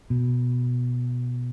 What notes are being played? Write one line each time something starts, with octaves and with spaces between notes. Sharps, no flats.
B2